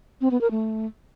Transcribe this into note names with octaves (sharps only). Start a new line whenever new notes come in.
C4
B3
A#4
A3